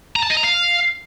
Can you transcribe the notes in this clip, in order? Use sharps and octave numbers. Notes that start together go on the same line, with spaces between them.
A#5
A5
D#5
A#5
F5